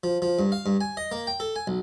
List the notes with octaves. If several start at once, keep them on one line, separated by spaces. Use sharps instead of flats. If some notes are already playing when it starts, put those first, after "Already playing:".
F3
F3
G2
F5
G2
G#5
D#5
A#3
G5
A4
G#5
B1